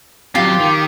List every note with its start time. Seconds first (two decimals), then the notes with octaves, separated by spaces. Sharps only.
0.35 F#3 C4 F4 G4
0.60 D#3